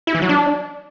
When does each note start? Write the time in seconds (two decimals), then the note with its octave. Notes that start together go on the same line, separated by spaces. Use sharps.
0.07 E4
0.15 E3
0.22 F#3
0.29 D4